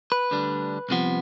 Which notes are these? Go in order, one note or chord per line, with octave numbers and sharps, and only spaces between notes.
B4
D2 D3 G3 D4
C2 C3 F3 B3